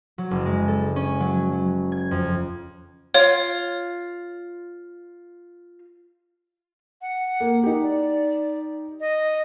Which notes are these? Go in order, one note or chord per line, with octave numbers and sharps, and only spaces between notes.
F#3
F#1
G#3
A4
C#4
F#3
F#3
G#6
F2
F4 C#5
F#5
A#3
D#4 G4
D5
D#5